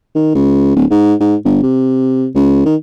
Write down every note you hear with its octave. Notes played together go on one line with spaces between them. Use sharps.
D#3
C#2
D1
G#2
G#2
G1
C3
C#2
D#3